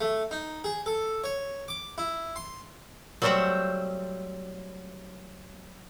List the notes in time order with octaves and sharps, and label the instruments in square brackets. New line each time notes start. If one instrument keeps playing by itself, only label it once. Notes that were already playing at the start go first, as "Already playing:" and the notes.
[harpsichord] A3
D#4
G#4
A4
C#5
D6
E4
C6
[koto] F#3 G3 A3 C4 E5 F#5